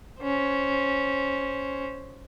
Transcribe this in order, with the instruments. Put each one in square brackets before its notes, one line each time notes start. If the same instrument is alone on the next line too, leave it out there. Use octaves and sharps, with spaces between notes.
[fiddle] C#4 C5